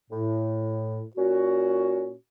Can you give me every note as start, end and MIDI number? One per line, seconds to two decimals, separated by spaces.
0.11 1.03 45
1.16 2.14 46
1.16 2.14 61
1.16 2.14 66